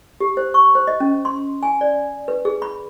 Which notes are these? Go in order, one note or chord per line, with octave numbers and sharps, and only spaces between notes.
G4
C5
C#6
C5
D#5
C#4
C6
G#5
D5
B4
G#4
B5